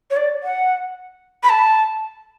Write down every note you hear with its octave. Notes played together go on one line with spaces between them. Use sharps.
C#5
D5
F#5
B5
A5